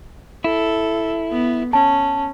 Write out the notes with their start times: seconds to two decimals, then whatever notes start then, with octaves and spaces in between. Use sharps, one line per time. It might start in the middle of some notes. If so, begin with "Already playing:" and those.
0.44 E4 A4
1.31 B3
1.73 C#4 A5